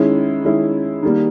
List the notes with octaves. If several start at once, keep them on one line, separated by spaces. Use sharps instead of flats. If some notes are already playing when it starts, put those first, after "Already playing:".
Already playing: D#3 G#3 C#4 E4
D#3 G#3 C#4 E4
D#3 G3 A#3